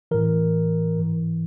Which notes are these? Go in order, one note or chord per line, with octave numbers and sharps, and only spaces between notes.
A2 E3 A#4
G#2 E3